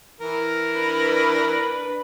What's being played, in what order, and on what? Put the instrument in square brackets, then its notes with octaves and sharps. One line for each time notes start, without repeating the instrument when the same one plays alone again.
[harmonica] E3 A#4
[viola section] D4 B4 B5